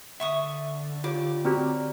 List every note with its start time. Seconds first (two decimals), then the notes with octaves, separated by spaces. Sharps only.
0.20 D3 E5 C#6 D#6
1.04 F4 G4 C#5 D6
1.45 C4 F#4 G4 D5 A#5 F6